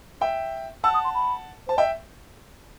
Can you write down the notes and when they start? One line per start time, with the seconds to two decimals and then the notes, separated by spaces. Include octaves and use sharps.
0.21 E5 G5
0.84 F#5 A5 E6
0.94 D#6
1.04 C6
1.15 B5
1.68 C5 A5
1.78 D#5 E5 G5